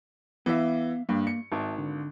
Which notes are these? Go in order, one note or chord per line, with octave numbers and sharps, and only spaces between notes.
E3 B3 E5 F5
G2 A#3
C#7
G#1 E5 A5
D3